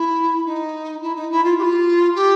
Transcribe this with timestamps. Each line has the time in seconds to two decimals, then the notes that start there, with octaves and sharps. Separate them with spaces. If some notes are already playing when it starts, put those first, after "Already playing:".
Already playing: E4
0.45 D#4
1.02 E4
1.16 D#4
1.30 E4
1.44 F4
1.58 G4
1.62 F4
2.15 G4